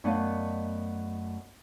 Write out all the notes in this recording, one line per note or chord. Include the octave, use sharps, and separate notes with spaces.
F#2 A3 B3 D5 D#5 F5